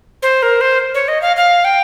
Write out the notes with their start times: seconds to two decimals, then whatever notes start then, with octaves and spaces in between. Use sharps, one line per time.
0.22 C5
0.43 A#4
0.61 C5
0.94 C#5
1.08 D#5
1.22 F5
1.37 F5
1.65 G5